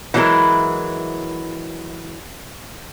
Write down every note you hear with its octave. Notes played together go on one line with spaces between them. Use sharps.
E3 F#3 G#3 C4 E4 A#4